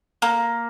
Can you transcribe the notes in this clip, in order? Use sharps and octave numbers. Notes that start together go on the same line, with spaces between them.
A#3